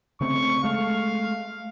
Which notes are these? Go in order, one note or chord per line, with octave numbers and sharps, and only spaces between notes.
C#3 A3 C4 C#6
G#3 A3 F5